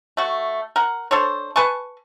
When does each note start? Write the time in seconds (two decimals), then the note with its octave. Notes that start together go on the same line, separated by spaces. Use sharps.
0.17 A3 F#4
0.76 A#4 F#5
1.11 D4 A4 C5 C#5
1.56 B4 G#5 A5 C#6